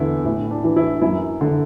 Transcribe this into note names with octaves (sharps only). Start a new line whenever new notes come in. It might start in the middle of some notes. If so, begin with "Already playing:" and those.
Already playing: E2 D3 E4
A2 E4
D4
E3
E4
F#2 E4
D3